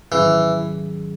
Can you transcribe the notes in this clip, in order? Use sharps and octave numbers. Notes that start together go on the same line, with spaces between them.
G#2 D#3 E3 F#3 C#4 G#4